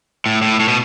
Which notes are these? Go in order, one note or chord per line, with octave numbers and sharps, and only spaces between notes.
A2
A2
A2
B2